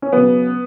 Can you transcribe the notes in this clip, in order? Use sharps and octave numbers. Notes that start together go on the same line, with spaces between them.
C#4
C#3 F#3 B3